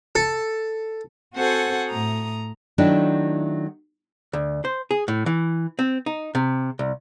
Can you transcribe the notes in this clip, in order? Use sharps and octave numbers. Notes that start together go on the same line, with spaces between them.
A4
C4 F#4 A4 C5 F#5 G#5
A2 A#5 D#6
D#3 F#3 A3 D4 E4
D2
C5
G#4
A2
E3
C4
D#4
C3
C2